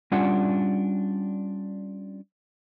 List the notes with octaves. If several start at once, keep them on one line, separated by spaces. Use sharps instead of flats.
G3 C#4 D4 F4 F#5